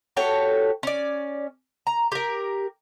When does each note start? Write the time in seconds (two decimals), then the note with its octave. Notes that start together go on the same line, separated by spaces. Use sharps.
0.17 F#4 G4 A4 C#5
0.83 C#4 D5
1.87 A#5
2.12 G4 A#4